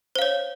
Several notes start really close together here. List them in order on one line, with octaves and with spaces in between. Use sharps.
C5 F5 C#5